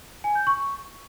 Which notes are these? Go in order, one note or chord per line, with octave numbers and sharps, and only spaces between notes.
G#5
G6
C#6